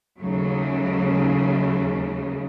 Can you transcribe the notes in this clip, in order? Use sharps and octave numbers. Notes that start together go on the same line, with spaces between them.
D#2 C#3 F#3 A3